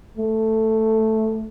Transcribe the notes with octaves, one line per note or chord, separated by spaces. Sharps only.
A3